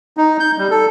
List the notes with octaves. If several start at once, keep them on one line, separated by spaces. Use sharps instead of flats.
D#4
G6
G3
A4